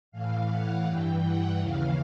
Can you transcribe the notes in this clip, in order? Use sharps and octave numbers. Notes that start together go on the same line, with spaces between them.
A2 E3 F5
F#5
G2 E3 G5
F#5
D#2 C#3 E3 F5